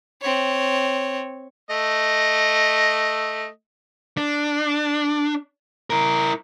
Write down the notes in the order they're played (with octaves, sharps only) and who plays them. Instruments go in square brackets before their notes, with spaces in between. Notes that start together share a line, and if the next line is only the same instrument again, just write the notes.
[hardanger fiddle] C4 C#5
[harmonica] A3 D#5
[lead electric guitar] D4
E4 A#4